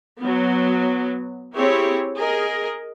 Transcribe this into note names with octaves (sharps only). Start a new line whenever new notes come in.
F#3 B3
C4 E4 G4 G#4 C#5
G#4 A#4 D#5